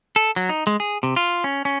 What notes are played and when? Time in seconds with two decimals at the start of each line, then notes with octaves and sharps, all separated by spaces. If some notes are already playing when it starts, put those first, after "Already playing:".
0.16 A4
0.36 F#3
0.49 D#4
0.67 G#3
0.80 G#4
1.03 C3
1.16 F4
1.44 C#4
1.65 C#4